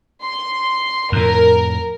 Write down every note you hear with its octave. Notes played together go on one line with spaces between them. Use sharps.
C6
F2 A2 A#4